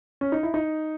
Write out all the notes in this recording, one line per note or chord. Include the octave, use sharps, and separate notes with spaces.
C#4
D#4
E4
D#4